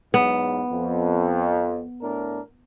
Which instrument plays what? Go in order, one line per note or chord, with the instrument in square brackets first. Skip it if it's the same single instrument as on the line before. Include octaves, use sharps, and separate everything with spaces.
[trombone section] E2 G#2 F#3 [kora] B3
[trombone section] F2
A2 D4 A#4